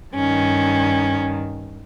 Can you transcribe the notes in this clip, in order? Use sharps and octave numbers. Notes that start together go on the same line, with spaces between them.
G2 D#3 C#4